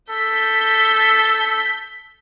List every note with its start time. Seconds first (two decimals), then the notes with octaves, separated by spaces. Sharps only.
0.10 A4 G6 B6